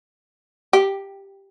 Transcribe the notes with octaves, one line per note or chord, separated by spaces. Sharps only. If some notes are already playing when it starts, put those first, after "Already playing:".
G4